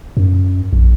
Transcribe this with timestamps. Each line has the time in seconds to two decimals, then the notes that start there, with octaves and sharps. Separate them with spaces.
0.17 F#2
0.73 A#1